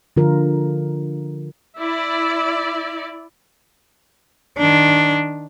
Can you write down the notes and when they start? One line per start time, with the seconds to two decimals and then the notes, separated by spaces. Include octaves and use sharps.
0.16 D3 F3 F4 A#4
1.78 E4 D5
4.58 D#3 D4